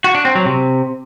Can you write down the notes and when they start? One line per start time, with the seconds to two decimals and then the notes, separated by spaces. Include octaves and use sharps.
0.04 F#4
0.15 D4
0.25 C4
0.35 F#3
0.45 C3